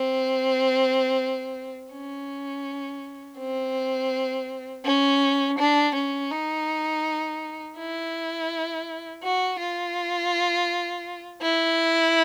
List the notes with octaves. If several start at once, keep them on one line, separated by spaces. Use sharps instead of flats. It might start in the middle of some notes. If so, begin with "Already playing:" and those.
Already playing: C4
C#4
C4
C#4
D4
C#4
D#4
E4
F#4
F4
E4